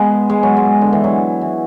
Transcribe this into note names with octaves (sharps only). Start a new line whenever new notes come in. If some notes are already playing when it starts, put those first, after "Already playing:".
Already playing: G#3 B3
G#3
F#3
G#3
D3
E3
F#3
E3